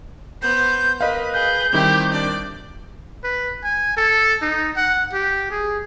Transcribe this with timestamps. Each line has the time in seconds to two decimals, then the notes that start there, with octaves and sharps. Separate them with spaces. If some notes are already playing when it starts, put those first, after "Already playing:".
0.42 B3 C5 G6
1.01 A#4 B4 D#5 F5 B5
1.33 G#4 G6
1.73 D#3 G3 C4 E4 G4 D6
2.12 D4 D5
3.24 B4
3.64 G#5
3.97 A4
4.42 D#4
4.77 F#5
5.13 G4
5.51 G#4